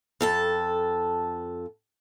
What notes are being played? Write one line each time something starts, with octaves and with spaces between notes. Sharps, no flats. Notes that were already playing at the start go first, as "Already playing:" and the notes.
F2 A4 A5